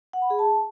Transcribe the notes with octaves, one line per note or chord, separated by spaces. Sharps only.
F#5
B5
G#4
A5